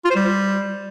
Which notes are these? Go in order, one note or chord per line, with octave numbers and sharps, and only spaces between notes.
F4
C5
G3